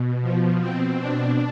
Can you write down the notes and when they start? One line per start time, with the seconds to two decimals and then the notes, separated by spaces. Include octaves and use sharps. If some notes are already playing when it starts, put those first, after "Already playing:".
Already playing: B2
0.22 F3
0.60 B2 C4
0.99 D4